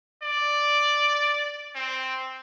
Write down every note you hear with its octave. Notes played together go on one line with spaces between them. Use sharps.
D5
C4